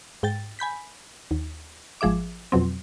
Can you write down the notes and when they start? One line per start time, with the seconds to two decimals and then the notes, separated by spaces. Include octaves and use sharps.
0.23 G#2 G5 A6
0.59 G#5 B5 G6 B6
1.31 D#2
2.01 G#1 F3 G#4 E5 D6
2.52 F2 B2 F#3 C4